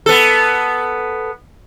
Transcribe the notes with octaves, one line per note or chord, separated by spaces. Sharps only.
B3 A4